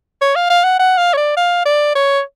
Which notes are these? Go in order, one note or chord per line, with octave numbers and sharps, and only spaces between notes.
C#5
F5
F5
F#5
F#5
F5
C#5
D5
F5
D5
C#5